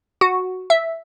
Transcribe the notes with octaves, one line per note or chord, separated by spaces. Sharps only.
F#4
E5